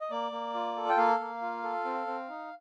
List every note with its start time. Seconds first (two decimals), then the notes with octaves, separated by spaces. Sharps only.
0.01 D#5
0.10 A#3 D5
0.32 A#3
0.55 F4
0.77 A4
0.89 G5
0.97 A#3 F5
1.20 A#3
1.41 F4
1.64 A4
1.85 C4
2.07 C4
2.29 D#4